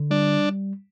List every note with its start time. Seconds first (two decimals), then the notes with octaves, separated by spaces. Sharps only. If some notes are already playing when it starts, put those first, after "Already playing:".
Already playing: D3
0.11 G3 D4